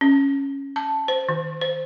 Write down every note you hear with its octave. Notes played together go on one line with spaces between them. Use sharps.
C#4
A5
C5
D#3
C5